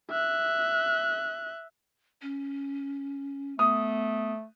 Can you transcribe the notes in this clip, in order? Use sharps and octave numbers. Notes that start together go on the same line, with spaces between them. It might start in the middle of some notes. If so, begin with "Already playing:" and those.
E5 F#6
C#4
A3 B3 D#6